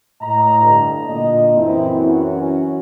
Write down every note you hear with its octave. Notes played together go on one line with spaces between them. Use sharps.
A2 D#5 A#5
G2 D3
A#2 D3 D#5
F#2 E3 C4 E4
C#4 F#4